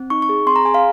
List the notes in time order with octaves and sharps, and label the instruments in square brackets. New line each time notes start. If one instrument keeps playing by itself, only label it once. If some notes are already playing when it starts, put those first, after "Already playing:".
Already playing: [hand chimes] C4
D#4 C#6
C#6
G#4
C4 C6
A#5
G#4 G#5
F5